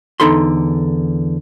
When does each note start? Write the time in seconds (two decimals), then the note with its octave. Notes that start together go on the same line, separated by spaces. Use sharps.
0.20 E2 D3 D#4 A4 B5 C6